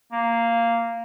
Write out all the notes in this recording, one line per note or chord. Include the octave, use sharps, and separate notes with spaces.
A#3